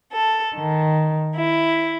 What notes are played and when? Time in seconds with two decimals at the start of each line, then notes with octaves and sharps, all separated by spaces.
0.12 A4
0.55 D#3
1.36 E4